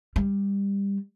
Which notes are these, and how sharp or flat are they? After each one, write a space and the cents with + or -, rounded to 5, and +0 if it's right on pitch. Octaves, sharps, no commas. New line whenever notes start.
G3 +20